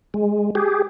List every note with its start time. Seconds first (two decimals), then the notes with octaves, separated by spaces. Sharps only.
0.14 G#3
0.55 G4 G#4